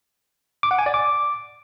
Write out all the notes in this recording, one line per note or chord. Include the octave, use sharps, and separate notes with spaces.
D6
F#5
G#5
D5
D6